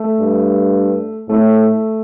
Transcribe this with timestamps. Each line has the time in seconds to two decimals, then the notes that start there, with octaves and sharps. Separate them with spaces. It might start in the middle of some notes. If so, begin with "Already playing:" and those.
Already playing: A3
0.20 G2
1.29 A2 A3